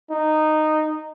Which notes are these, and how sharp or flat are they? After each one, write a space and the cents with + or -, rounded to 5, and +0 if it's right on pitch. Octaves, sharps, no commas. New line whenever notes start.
D#4 -10